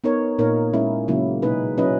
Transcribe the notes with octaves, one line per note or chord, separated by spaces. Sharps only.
B3 D#4 A#4 C#5
A#2 A#3 D#4 A#4 C#5
G#3 C#4 E4
C#3 F#3 A#3 E4
B2 A#3 D#4 G#4 B4
F#3 C#4 E4 B4 D#5